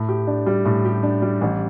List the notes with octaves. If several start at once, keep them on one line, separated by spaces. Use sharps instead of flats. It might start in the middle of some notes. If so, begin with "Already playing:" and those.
Already playing: A2
G4
D4
G3
A2
G4
D4
G3
A1